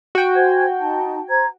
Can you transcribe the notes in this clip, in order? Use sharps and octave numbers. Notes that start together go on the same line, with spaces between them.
F#4 G5
C5 G#5 G#6
D#4 A5
C5 A#5 G#6